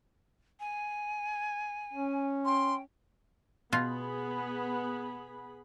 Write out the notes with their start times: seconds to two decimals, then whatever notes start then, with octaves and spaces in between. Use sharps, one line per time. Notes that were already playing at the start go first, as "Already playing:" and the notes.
0.60 G#5
1.93 C#4
2.45 G5 C6
3.72 B2 B3 F4 G#4 B5